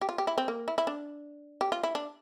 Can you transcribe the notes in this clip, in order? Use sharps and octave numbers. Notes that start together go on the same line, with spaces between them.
G4
F4
G4
E4
C4
A#3
E4
E4
D4
G4
F4
E4
D4